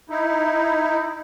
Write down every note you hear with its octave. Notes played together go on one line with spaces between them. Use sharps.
D#4 E4